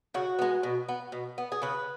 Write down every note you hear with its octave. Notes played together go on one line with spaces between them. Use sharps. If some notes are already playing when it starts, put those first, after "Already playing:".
C#3 F#4
G#3 B3
B2
B3
B2
B3
G#4
C#3 B4